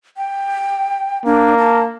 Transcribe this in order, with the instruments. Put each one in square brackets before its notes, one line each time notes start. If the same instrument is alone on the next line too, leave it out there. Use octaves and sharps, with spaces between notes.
[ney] G5
[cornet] A#3 [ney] D4
[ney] A5